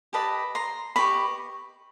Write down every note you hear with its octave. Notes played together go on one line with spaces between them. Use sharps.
G4 B4 D#5 A5 B5
A#5 C6
G4 B4 D#5 B5 C#6